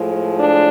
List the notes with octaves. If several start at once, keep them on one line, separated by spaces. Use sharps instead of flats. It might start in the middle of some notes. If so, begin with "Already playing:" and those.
Already playing: A2 F3 G#3
D4